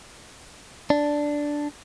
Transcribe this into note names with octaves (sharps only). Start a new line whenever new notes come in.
D4